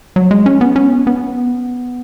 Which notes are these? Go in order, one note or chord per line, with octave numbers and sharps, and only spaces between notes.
F#3
G#3
C#4
B3
C#4
B3